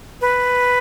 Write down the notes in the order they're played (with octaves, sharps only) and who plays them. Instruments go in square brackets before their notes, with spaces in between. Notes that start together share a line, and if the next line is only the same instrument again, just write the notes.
[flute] B4